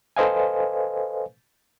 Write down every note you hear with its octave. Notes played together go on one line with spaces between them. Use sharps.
A4 B4 C5 D#5 F5 G#5